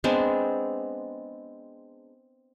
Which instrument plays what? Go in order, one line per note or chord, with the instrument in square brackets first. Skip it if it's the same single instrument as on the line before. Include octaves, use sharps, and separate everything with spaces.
[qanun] G#3 B3 C4 D4